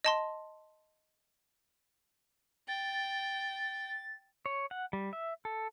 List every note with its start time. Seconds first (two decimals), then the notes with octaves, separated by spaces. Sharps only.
0.04 D#5 A5 C6
2.68 G5 A6
4.46 C#5
4.71 F#5
4.93 G3
5.13 E5
5.45 A4